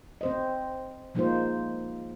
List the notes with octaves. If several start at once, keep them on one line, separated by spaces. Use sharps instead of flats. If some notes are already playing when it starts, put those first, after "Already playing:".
C4 C5 D#5
F3 G#3 A#3 D#4 F4 C5